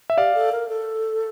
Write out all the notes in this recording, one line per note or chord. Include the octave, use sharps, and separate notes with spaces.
E5
G4 D5 F5
A4
A#4
A4